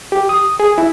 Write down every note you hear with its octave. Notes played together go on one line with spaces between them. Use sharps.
G4
D#6
G#4
E4